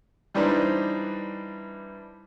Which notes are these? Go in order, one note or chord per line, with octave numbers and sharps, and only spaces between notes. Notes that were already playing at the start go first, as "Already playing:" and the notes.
E3 G3 D4 D#4 B4 C5